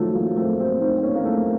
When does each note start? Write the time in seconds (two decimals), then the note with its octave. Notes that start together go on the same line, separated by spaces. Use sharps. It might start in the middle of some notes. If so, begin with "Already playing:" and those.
Already playing: D#3 F3 F#3 A3
0.15 F#3 A#3
0.37 A3 C4
0.59 A3 C4
0.81 C4 D#4
0.97 C4
1.03 A#3 C#4
1.15 A#3
1.25 A3 C4